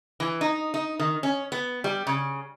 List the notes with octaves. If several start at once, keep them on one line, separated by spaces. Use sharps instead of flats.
E3
D#4
D#4
D#3
C#4
B3
G3
C#3